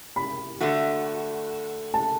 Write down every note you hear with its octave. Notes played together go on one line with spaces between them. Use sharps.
B5
D3 A3 F#4
A5